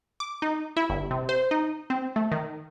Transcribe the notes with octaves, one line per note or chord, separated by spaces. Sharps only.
D6
D#4
E4
G1
C3
C5
D#4
C4
A3
D#3